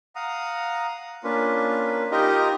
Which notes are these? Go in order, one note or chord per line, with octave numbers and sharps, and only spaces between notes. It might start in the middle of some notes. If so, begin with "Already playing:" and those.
F5 F#5 A#5 D#6
A#3 C#4 D4 F4 B4
D#4 F4 G4 A#4 D#5